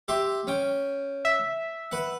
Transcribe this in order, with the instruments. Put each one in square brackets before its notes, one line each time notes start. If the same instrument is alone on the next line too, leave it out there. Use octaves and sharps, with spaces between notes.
[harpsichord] G4 E5 C6
C#4 G5
[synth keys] E5
[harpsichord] B4 F#5